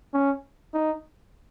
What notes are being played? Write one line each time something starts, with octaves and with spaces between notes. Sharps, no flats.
C#4
D#4